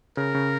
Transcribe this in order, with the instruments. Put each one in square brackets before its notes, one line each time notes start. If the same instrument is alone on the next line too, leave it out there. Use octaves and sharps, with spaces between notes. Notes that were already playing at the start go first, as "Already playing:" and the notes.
[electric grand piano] C#3 [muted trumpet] A#4
[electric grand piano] C#3